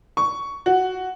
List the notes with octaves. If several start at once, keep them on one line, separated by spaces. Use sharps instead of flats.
C#6
F#4